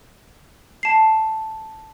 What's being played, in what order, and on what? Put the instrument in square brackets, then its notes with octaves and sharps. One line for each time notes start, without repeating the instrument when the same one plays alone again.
[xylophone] A5 C7